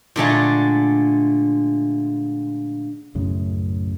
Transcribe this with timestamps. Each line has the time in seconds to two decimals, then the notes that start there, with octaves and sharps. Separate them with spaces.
0.16 A#2 D3 G#3 A3
3.15 B1 F#2 A2 C#3